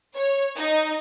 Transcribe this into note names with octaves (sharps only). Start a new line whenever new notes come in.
C#5
D#4